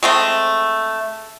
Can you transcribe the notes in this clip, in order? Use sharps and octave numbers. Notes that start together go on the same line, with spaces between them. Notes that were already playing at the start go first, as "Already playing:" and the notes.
G#3 A3 C4